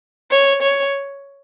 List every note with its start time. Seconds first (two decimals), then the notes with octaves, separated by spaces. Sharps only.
0.31 C#5
0.62 C#5